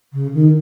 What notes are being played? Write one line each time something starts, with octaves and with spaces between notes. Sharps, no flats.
C#3
D#3